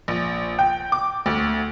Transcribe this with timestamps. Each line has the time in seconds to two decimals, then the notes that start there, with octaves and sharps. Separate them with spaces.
0.08 A#1
0.59 G5
0.92 D6
1.26 D2